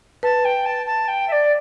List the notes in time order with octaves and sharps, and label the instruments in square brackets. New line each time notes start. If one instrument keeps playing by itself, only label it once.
[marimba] B4 [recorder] A5
[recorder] G5
A5
A5
G5
E5
D5